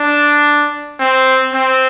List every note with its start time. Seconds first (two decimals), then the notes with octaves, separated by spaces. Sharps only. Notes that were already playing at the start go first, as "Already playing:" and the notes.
Already playing: D4
1.00 C4
1.53 C4